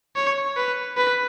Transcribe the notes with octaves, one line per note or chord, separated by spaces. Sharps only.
C#5
B4
B4